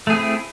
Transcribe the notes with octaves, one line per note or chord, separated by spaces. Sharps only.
A3 C4 E4 G#4